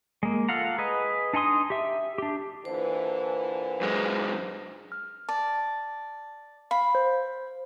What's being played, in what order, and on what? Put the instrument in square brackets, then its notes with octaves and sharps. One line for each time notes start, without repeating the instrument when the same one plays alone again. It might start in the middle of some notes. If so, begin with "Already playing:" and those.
[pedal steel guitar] G#3 A#3
F4 A4 F5 F#5 A#5
G#4 B4 D#5
D4 D#4 G#5 C6 D#6
G4 E5
D4 G4
[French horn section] A#2 D3 E3 [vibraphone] C5
[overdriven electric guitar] F#2 G#3
[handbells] F6
[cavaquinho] D5 [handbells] A5
[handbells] F5 [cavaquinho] B5
[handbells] C5